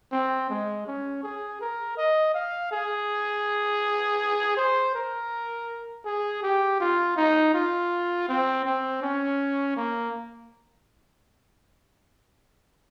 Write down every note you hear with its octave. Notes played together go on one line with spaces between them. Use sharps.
C4
G#3
C#4
G#4
A#4
D#5
F5
G#4
C5
A#4
G#4
G4
F4
D#4
F4
C4
C4
C#4
A#3